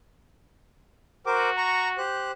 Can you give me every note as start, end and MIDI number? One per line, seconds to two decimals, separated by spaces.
1.26 2.02 66
1.26 1.50 70
1.26 1.50 72
1.26 1.50 86
1.57 1.88 82
1.57 1.88 85
1.98 2.31 67
1.98 2.31 72
1.98 2.31 90